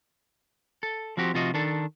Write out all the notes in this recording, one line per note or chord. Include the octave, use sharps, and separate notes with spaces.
A4
F3 C4 F#4 G4
C3 F3 F4 F#4 D#5
D#3 D4 A4